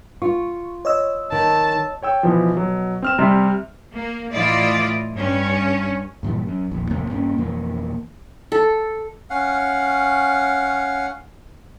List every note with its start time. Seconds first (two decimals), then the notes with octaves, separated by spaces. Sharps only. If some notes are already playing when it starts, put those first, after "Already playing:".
0.22 F4 C#6
0.85 C#5 D#5 E6
1.32 D#3 A5
2.02 C#5 G5 E6
2.23 B2 E3 F3
2.57 B2 F#3
3.02 C4 F6 E7
3.19 C3 G3
3.92 A#3
4.34 A2 E3 E4 F4 D5 D#5
5.15 G2 C#4
6.23 G2 A#2 E3 G3
6.47 F#2
6.71 E1 A#1 D#2
6.91 A1 F2 C3 A#3
7.10 G2 A#3 C4 C#4
7.38 F2 B2 E3 A#3
8.52 A4
9.30 C#4 F5 F#5